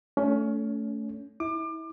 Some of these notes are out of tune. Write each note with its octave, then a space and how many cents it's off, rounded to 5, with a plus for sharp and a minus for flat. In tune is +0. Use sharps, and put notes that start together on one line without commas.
A3 +0 C#4 +25
E4 -30 D6 +35